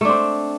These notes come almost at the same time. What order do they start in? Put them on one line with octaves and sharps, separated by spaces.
A3 D4 C4